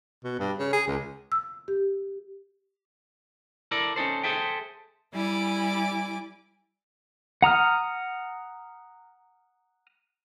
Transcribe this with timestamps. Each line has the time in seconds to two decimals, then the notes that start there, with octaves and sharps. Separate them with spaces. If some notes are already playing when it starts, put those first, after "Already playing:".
0.24 B2
0.39 G2
0.58 C#3
0.73 G#4
0.87 C#2
1.32 E6
1.68 G4
3.71 E4 A4 A#4 D5
3.96 C#4 D#4 A4 C5
4.23 G#4 A4 C5 E5 G5
5.13 G3 E4 G#5 D6
7.42 F#5 A#5 D#6 F6